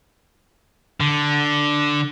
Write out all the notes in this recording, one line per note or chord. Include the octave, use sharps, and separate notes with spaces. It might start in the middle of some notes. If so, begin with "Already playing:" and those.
D3